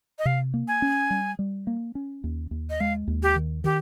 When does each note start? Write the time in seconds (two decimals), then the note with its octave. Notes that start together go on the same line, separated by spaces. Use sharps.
0.19 D#5
0.25 C3 F5
0.54 A#3
0.68 G#5
0.82 C#4
1.10 G3
1.39 G3
1.67 A#3
1.95 C#4
2.24 D#2
2.51 D#2
2.70 D#5
2.80 G#3 F5
3.08 D#2
3.23 G4
3.36 D#3
3.64 D#3 G4